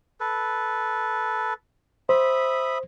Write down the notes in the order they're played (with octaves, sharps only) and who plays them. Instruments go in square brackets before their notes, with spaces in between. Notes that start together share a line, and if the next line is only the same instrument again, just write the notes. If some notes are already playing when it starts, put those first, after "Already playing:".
[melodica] A4 B4
[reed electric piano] C5 [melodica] E5 B5 D#6